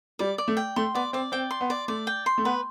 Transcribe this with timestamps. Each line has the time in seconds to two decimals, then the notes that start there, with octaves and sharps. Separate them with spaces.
0.19 G3 D5
0.38 D5
0.48 A3
0.57 G5
0.76 A3 C6
0.95 B3 D5
1.13 C4 D5
1.32 C4 G5
1.51 C6
1.61 B3
1.70 D5
1.88 A3 D5
2.07 G5
2.26 C6
2.38 A3
2.45 B3 B4